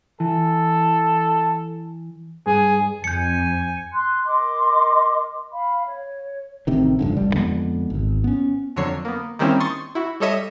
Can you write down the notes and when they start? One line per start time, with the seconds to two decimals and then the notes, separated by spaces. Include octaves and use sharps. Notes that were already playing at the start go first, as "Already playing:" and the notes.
0.20 E3 A4
2.46 G2 G#4
3.04 F2 G#5 G6 C#7
3.93 C6 F#6
4.25 A#4 D#5 C6 D6
5.53 F5 B5
5.87 C#5
6.67 A1 C3 D#3
6.99 F1 G2 D3
7.17 A1 G2 G3
7.33 F2 D3 G#3 B3
7.90 G#1
8.24 B3 C#4
8.76 F2 D3 F#3 C#5 C7
9.05 A#3 B3
9.39 D#3 G3 A#3 C4 C#4 E4
9.60 C6 C#6 D#6 A6
9.95 E4 F#4
10.20 G3 A4 C#5 D#5 E5